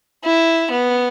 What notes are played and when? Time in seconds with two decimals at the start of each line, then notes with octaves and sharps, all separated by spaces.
0.24 E4
0.72 B3